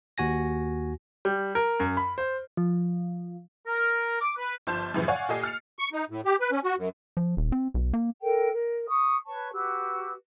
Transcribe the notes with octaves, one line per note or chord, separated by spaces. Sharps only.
D#2 F#4 G#5 A#6
G3
A#4
F#2
B5
C5
F3
A#4
D6
B4
G1 F3 A5 C6 G6 E7
F#2 A2 C#3 E3 F3
C#5 D5 F5 F#5 G#5 C#6
A#2 G4 A4 D#5 G#5 C7
F6 A6 C#7 F7
C#6
D#4
A2
G4
B4
C#4
F#4
F#2
F3
D#1
C4
B1
A#3
A4 A#4 G5
A#4
C#6 D#6
B4 C#5 A5 C#6
F#4 G4 B4 E6